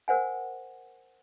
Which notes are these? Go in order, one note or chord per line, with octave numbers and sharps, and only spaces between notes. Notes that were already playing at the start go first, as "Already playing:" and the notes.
A#4 C5 F#5 G#5